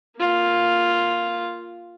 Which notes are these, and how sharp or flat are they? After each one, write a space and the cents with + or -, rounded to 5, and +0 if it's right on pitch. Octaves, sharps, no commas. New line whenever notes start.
A#3 -5 F4 +0